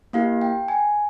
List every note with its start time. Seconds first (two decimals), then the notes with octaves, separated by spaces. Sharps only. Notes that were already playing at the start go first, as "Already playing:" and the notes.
0.13 A#3 E4 G4 F5
0.41 G5
0.68 G#5